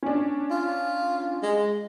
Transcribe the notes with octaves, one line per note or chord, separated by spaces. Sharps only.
C#4 D4
F4
G#3